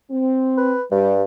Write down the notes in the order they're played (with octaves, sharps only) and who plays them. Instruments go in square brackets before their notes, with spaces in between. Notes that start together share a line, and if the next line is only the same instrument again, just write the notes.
[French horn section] C4
[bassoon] B4
[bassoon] G2 [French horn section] G3